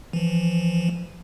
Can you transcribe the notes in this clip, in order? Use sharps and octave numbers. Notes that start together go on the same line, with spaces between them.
E3 F3